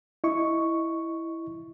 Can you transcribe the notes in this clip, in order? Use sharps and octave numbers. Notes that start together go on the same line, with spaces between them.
E4 D#5 C#6